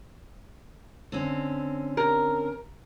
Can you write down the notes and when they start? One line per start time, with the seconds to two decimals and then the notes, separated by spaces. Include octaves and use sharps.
1.12 D3 C4 C#4
1.97 A#4